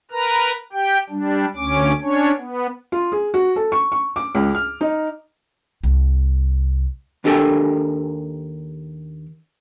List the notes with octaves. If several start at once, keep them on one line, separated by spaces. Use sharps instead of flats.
A#4 B4 A#5
G4 G5
G3 D4
D2 C#4 D6
C#4 D4 C#5
B3
F4
G#4
F#4
A4
C#6
C#6
D6
C#2
F6
D#4
C2
D#2 D4 G4 A4 A#4 G5